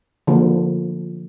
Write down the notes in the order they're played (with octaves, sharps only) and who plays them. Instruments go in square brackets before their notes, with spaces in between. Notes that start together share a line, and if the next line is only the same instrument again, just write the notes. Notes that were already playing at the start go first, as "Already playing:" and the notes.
[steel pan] D3 F3 A#3